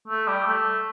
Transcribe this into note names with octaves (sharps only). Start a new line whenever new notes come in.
A3
G3
A3